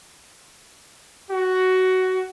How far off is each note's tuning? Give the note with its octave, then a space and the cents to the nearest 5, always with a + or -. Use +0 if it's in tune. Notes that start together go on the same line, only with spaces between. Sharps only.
F#4 +10